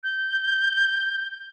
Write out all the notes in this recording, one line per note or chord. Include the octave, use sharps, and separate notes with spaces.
G6